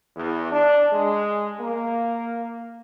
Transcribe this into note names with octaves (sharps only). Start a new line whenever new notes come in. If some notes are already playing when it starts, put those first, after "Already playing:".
E2
D4
G#3
A#3